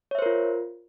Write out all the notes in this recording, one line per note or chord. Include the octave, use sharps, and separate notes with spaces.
F4 A#4 C5 C#5 E5